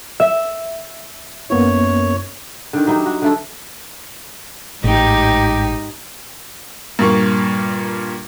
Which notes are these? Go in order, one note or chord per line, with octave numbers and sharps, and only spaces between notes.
E5
F#2 A#3 B3 E4 C#5
D3 D#3
F#3 D#4 E4 G4
F#4
D3 A3 A4
A1 G#2 D#4 G4
G2 A#2 A#3 C#6